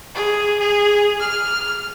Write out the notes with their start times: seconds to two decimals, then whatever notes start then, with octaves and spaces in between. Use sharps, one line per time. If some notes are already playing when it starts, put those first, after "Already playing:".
0.15 G#4
0.60 G#4
1.20 F6